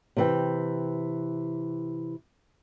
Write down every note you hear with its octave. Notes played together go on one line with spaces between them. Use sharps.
C3 E3 G5